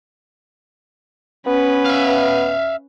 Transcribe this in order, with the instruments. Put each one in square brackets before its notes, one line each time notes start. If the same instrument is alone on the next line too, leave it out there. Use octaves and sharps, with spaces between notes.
[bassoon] B3 [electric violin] C#4 B4
[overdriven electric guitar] E5 F5